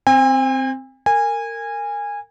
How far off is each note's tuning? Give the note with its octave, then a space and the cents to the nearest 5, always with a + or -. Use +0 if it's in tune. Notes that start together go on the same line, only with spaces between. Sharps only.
C4 +0 G#5 -45
A#4 -25 G#5 -20